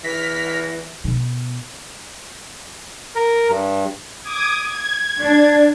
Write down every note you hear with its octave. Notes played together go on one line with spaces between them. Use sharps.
E3 F6 A#6 B6
B2
A#4
G2
D6 D#6 G#6
G#6
D4